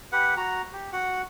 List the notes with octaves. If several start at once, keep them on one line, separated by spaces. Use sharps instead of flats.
G4 B4 F#5
F#4 A#5
G4
F#4 F#5